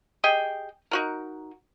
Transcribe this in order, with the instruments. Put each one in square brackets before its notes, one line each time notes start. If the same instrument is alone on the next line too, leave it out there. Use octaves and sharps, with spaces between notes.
[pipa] G4 G#4 D#5 G5
D#4 F#4 A#4